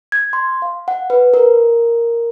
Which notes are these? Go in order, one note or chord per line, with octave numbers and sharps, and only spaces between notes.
G#6
C6
F5
F#5
B4
A#4